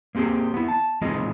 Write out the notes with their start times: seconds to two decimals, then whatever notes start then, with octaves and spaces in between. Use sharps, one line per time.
0.15 A#3 C4 G4 G#4
0.54 B3 E4
0.68 A5
1.01 E3 G#3 C4 F4 G#4 D#5